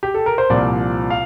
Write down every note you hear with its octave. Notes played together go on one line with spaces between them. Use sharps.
G4
A4
A#4
C5
C2 A#2 F3 D5
F5